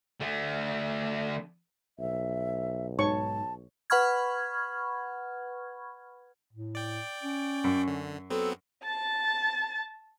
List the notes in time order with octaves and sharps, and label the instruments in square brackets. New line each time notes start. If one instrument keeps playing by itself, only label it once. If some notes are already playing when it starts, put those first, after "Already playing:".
[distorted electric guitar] D3 A3
[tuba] B1 [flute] E5
[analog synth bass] G#2 [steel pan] C#5 C#6 [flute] A5
[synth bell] B4 F#5 B5 C#6 F6 G#6
[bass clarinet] A2
[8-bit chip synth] D5 G5
[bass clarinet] C#4
[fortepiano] F#2
[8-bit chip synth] D3
[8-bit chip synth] F#3 B3 C4 [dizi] A4
[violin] A5 A6